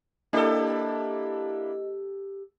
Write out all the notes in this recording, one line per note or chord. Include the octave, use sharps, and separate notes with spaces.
A#3 D4 E4 G4 A4 D#5